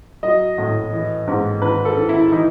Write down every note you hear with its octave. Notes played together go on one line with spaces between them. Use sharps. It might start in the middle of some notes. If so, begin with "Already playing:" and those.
F#3 D#5
A2
E3
G#2
D#3 B4
A4
D#3
E4
E3 D#4